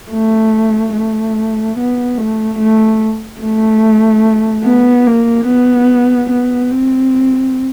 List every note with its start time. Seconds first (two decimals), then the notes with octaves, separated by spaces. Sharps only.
0.11 A3
0.94 A3
1.77 B3
2.18 A3
2.58 A3
3.41 A3
4.64 B3
5.06 A#3
5.47 B3
6.30 B3
6.71 C4